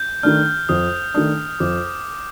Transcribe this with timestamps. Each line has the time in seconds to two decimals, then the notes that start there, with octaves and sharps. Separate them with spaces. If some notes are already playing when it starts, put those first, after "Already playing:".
Already playing: G6
0.23 D#3 A3 D4 F6
0.69 F2 D#6
1.14 D#3 A3 D4 D#6
1.60 F2 D6